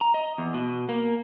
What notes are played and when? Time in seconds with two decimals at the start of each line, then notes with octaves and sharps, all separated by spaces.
0.01 A#5
0.14 D#5
0.38 E2
0.54 B2
0.89 A#3